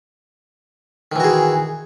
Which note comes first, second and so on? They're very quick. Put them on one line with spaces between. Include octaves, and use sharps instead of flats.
D#3 E3 F#4 G#4